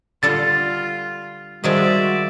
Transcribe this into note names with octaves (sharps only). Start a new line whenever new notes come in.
D3 G3 F4 A4 A6
D#3 F3 G3 G#3 F#4 D5 E5